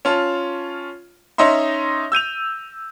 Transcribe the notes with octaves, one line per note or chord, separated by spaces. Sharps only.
C#4 F4 A5
C#4 D#4 D#5 E5 C6
E6 G6 D#7 F7